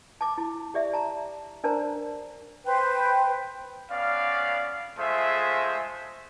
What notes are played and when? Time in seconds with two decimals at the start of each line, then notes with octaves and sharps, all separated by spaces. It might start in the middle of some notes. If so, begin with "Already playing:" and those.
0.21 A5 D6
0.38 E4
0.74 G4 D5 E5
0.93 A5 A#5
1.64 D4 A#4 C5 D5 A5 A#5
2.66 B4 C5 G5
3.91 B3 C#4 D5 F5
4.98 G#3 A3 F4 G#4 C5 E5